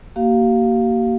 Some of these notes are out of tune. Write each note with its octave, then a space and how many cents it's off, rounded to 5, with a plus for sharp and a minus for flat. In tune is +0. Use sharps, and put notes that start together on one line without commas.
A#3 +0 G4 -45 F5 +0